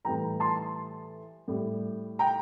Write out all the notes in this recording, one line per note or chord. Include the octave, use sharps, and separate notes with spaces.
A2 E3 G3 G5 A#5
A5 C6
A2 G3
G5 A#5